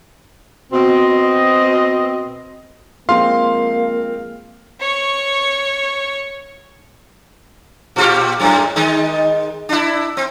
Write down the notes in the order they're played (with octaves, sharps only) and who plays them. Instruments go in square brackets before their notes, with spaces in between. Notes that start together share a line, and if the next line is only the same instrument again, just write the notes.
[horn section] B2 C4 D#5
[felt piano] F3 G#3 C4 [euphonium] A#3 [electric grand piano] F5 [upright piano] C6
[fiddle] C#5 C#6
[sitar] A#2 F4 G4
F#2 A2 G#3
D#3 G#3 D#4
D4 E4
C4